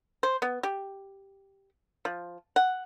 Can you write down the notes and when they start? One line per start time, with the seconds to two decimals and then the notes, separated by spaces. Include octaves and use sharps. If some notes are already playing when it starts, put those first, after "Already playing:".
0.23 C5
0.42 B3
0.63 G4
2.05 F3
2.56 F#5